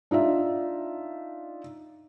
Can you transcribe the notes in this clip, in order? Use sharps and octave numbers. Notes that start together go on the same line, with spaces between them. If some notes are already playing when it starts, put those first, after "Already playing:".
D4 D#4 F4 E5